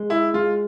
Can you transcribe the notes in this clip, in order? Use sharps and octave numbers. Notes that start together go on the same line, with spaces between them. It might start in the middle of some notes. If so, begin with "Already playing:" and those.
Already playing: G#3
E4 G#4
G#3 F4